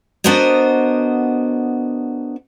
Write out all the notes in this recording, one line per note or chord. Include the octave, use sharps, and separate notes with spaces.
B3 D4 F#4 A#4 C5 D#5